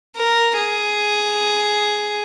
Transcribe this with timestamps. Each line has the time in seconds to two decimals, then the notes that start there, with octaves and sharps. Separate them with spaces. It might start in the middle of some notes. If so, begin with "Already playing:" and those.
0.16 A#4
0.57 G#4